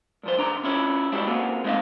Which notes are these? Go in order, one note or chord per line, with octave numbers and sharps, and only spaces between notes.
G2 F3 C5
B1 E2 D4 A#5 C6
C#4 E4 F4 C#5
G3 G#3 D4 E4 F#4 G4
A#3 C4 F4 F#4 G#4
G#3 C4 D#4 E4 E5 F5